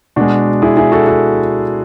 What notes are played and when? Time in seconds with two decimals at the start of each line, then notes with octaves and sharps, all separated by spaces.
0.16 B2 G#3 D4 F#4
0.62 E4 G#4
0.77 E4 G#4
0.92 F#4 A4
1.07 F#4 A4